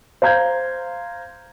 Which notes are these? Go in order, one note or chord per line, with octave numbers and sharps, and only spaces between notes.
C5 F5 A#5 G6 G#6